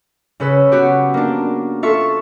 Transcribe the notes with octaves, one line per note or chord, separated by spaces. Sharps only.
C#3 C#4 B4 E6
B3 F#4 G4
A#3 D4
F4 A4 E5 C#6